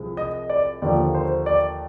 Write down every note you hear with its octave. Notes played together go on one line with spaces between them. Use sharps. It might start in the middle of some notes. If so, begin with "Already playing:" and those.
Already playing: C2 C3 F3 G#3 C4
D#5
D5
D#2 D3 F3 A#3 D5
C5
D5